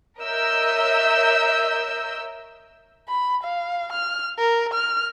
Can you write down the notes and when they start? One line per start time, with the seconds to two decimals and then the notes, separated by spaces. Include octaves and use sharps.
0.20 A#4 C#5 D#5 E5 E6 G6
3.08 B5
3.43 F5
3.93 F6
4.39 A#4
4.73 F6